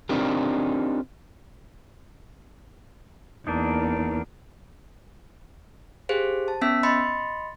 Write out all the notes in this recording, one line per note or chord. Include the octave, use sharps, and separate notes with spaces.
C4 D4 D#4 F4 G4 A#4
E2 A#3 D4 D#4
G4 G#4 C5 F5
A5
B3 C#4 E5 E6 B6
D#5 B5 C6 A6 C#7